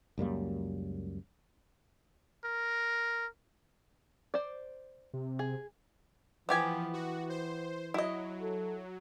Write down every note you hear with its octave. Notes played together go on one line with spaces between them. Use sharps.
C#2 F#2 G3 A#3
A#4
C5 D5
C3
G#4
E3 F3 B3 G4 G#5
F#4
C5
F#3 E4 D#5
A4